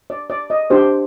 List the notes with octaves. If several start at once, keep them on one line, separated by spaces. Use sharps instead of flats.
D5
D5
D#5
D4 G4 C5